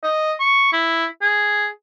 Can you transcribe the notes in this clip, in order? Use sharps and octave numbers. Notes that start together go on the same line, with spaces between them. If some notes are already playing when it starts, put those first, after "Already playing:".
D#5
C#6
E4
G#4